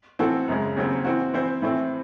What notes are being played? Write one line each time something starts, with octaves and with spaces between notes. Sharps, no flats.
A2 E3 C4 F#4 A4
F#2 C#3 G#3
D#2 C#3 F#3 C4
E3 C4 F#4
E3 C4 E4 C5
A2 E3 A3 C4